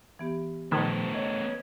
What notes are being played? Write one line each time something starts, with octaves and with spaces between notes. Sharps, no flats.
E3 B3 G4
A#2 D#3 F3 A3 B3 A5 G#6
C#5 D#5